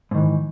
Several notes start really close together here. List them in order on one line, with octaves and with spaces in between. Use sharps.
G#2 D#3 E3